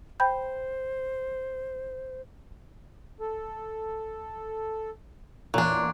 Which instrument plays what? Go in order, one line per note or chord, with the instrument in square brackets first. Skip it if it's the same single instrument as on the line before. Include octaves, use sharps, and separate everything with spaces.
[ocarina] C5 [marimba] G5 B5 G6
[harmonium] A4
[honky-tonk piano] A1 E2 A#2 [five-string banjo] F#3 D4